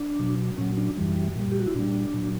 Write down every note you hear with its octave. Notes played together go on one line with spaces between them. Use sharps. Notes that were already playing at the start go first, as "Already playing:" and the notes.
Already playing: D4
B2 F#3
A#2 F#3 C#4
D4
F#2 E3 G3
A#2 G3
G4
F#4
E4
A#2 G3 D4
A#2 F#3